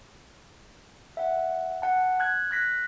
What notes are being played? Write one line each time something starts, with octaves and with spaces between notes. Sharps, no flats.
E5 F#5
F#5 A5
F#6 G#6
F#6 A#6 B6